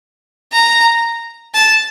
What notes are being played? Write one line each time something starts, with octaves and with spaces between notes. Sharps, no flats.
A#5
A5